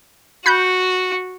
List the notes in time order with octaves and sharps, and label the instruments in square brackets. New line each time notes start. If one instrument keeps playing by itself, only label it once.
[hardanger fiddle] F#4 [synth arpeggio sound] B5 F#6 G6